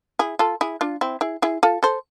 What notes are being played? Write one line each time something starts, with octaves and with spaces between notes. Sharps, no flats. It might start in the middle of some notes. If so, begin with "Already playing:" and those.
E4 G#4
F4 A4
E4 G#4
D4 F4
C4 E4
E4 G#4
E4 G#4
F4 A4
A4 C5